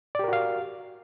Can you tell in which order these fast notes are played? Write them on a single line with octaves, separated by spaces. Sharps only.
D5 G4 A#4 F#4 F5